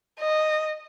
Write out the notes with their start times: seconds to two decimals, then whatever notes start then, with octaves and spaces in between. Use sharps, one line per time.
0.20 D#5